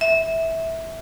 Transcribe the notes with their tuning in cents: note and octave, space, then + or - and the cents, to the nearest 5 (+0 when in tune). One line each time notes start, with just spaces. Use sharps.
E5 -15